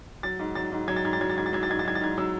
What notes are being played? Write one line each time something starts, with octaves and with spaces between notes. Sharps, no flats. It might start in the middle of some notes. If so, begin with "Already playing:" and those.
F#3 A6
G#2
F#3 A6
G#2
F#3 G#6
A6
G#2 G#6
A6
F#3 G#6
A6
G#2 G#6
A6
F#3 G#6
A6
G#2 G#6
A6
F#3 G#6
A6
G#2 G#6
F#3 E6